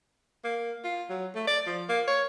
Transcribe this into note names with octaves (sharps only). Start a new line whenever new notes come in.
A#3
F4
F#3
A3
D5
F3
A#3
C#5